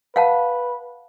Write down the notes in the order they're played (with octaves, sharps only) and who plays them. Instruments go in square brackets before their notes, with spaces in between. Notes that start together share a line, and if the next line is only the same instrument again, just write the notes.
[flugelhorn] B4 [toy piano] F5 F#5 A5